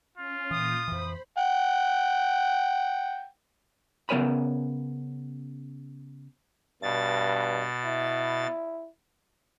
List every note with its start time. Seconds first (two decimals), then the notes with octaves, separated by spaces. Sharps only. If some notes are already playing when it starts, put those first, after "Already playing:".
0.17 C#4 F4
0.51 A#2 E3 D#6 G6 A#6
0.88 F2 E3 C5 B5
1.38 F#5 G5
4.09 C#3 B3 A#4 C#5 G#5 B5
6.82 G2 B2 A6
7.85 E4